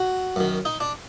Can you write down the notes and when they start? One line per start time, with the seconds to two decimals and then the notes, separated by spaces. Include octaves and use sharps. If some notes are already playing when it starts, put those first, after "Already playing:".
Already playing: F#4
0.36 F#2 D#3
0.65 D#4
0.80 D4